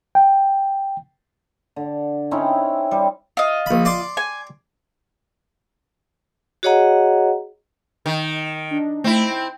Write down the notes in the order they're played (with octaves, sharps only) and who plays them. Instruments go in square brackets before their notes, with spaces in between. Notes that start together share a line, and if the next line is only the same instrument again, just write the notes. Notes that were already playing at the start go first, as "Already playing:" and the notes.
[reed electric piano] G5
[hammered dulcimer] D3
C4 C#4 D#4 E4
G3
[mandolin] F4 D#5
[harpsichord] A#1 B5
D5 C6 D6
[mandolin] G#5
[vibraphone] F#4 G#4 C#5 D#5 F#5 A#5
[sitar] D#3
[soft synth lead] D4
[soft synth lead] A3 [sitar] C4 E4
[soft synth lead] G5